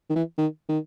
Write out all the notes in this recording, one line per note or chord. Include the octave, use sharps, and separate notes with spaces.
D#3
E3
D#3
D#3